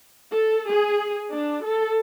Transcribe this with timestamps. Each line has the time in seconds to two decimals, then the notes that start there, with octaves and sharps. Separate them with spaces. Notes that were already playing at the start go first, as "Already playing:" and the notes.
0.33 A4
0.70 G#4
1.34 D4
1.65 A4